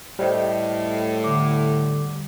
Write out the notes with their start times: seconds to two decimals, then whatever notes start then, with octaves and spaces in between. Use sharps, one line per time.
0.19 A2 G3 C5 D#5 G5
1.24 D3 D6